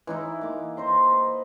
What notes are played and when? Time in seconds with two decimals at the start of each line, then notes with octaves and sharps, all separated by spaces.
0.07 E3 D#4 E4
0.41 A#3 D6
0.77 C5 D#5 A#5 C6
1.11 B4